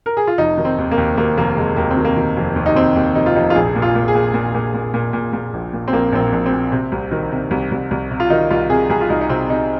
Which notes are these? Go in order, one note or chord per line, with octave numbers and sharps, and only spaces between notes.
A#4
G#4
F4
F1 D#4
D#3
C4
D#2
A#3
D#2
D#2 A#3
F1 A#3
F1 G#3
D#2 A#3
C4
D#3
A#3
D#3
F1
D#2
D#4
D#2 C4
D#2
F1 D#4
F4
F1 D#4
F4
A#1 G#4
A#2
F4
A#2
G#4
A#2
A#2
A#2
A#2
A#2
A#2
A#2
A#1
A#2
C4
A#1 A#3
A#1 C4
A#3
A#1
C4
A#2
C3 C4
C2
D#3
C3
C2
C2
C2
C3
F4
D#3 D#4
C2 F4
C3 G#4
C2 G#4
F4
C2 D#4
D#4
C3 C4
C3 D#4